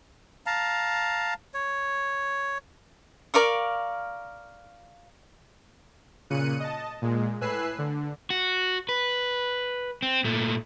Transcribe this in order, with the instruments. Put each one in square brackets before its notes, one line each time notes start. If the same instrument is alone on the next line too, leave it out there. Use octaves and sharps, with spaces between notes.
[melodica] F5 A5 A#5
C#5
[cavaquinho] A#4 D5 F5 C#6
[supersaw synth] A#2 C#3 F#6 C#7 D#7
D#5 A5
A#2 G#3
A2 B4 G#5 E6 F#6 C7
D3
[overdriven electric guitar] F#4
B4
C4
A#2 A3